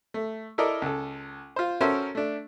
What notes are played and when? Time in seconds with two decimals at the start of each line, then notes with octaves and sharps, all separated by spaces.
0.14 A3
0.58 E4 A4 A#4 D5 D#5
0.82 C#2 A4
1.56 F4 C5
1.81 C#4 F#4 A4 A#4 C5 E5
2.15 A3 D4